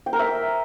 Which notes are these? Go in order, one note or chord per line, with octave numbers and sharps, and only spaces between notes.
G5
A#4
E5